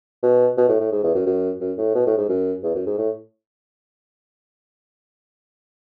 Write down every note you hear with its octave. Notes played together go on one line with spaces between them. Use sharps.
B2
B2
A2
A2
G#2
E2
F#2
F#2
F#2
A2
B2
A2
G#2
F#2
E2
F#2
G#2
A2